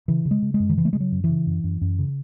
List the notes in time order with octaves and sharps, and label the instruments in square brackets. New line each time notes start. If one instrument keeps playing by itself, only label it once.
[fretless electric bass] C#3 E3
C#3
G#3
C#3
G#3
F#2
D#3
C#3 E3
A3
C#3 G#3
F#3
F#2
E3
C#3
F#2
F#2
F#2
C#3